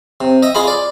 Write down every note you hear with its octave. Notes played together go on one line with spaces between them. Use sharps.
C3
D#5 E5
F4 G#4 F5 B5
D5